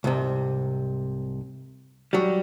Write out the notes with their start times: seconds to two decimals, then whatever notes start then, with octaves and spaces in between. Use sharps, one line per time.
0.04 C2 G#2 C3
2.13 F#3 G3